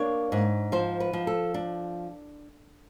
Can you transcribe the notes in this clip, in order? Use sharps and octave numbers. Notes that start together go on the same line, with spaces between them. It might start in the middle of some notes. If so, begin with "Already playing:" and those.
Already playing: A#3 D4 C#5
G#2
F3 C5
B4
F3
A4
D4